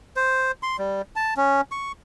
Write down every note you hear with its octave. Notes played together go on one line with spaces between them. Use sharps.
C5
C6
G3
A5
C#4
C#6